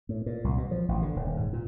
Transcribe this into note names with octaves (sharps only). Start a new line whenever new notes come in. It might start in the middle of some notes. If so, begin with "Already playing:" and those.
A2
A#2
C2
B2
F3
A1
D3
D#1
G#2
A#2